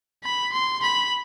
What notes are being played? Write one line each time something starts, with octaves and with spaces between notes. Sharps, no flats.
B5
C6
B5